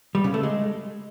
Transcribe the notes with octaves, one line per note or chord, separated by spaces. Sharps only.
G3
C#3
A3
G#3